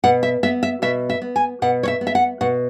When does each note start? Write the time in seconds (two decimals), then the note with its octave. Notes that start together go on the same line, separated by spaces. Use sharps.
0.04 B2 F#5
0.23 E5
0.43 B3 E5
0.63 E5
0.82 B2 E5
1.10 E5
1.22 B3
1.36 G#5
1.62 B2 F#5
1.83 C#5
1.88 E5
2.01 B3
2.07 E5
2.15 F#5
2.41 B2 F#5